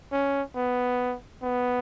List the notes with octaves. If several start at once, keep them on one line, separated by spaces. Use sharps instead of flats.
C#4
B3
B3